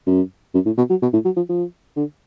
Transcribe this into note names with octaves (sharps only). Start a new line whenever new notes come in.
F#2
F#2
A2
B2
F#3
B2
A2
F#3
F3
F3
D3